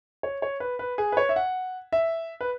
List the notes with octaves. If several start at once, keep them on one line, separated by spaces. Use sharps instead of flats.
C#5
C#5
B4
B4
G#4
B4
C#5
E5
F#5
E5
B4